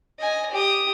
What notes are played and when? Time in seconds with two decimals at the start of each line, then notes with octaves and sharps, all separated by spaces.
0.19 D#5 G#5
0.51 G4 D#6